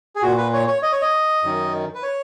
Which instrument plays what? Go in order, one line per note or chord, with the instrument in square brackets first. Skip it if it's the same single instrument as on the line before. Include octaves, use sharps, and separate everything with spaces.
[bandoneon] G#4
A#2 F#4
B4
C#5
C#5
D#5
C#5
D#5
F#2 D#3
B4
C#5